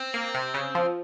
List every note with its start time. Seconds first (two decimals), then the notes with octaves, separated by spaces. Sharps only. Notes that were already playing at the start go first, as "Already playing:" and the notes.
Already playing: C4
0.14 A#3
0.34 C3
0.54 C#3
0.75 F3